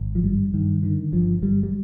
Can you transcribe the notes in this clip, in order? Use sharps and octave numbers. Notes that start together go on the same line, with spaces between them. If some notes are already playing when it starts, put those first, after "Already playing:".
Already playing: G#1
F3
G2 G3
G2 D#3
D3 D#3
G1 F3
G1 G3
G3